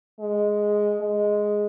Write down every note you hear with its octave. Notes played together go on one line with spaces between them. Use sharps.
G#3
G#3